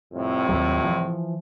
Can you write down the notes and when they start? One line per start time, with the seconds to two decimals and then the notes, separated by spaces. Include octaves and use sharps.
0.13 C2 F2 A2
0.49 D#2 F#3
0.84 E3 F3